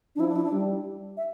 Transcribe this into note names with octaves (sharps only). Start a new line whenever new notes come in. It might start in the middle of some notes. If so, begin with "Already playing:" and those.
D4
F3 E4
D4
E4
D4
G3
E5